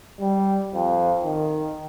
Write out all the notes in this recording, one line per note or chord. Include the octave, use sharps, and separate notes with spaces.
G3
F2
D#3